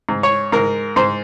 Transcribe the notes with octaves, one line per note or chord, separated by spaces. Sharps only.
G#2
C#5
G#2 A#4
G#2 C5